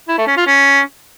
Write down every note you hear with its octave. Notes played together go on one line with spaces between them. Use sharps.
E4
A3
C#4
F4
C#4